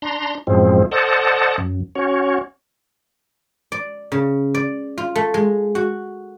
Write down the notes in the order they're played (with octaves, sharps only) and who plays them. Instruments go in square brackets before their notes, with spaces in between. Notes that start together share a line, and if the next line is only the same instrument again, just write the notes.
[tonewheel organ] D4 A#5 C6
F#2 A2 F3 G#3 C4
A4 C5 D5 D#5 F#5 A5
F#2
C#4 F#4 C#5
[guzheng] D5
C#3
D5
F4
A3
G#3
F#4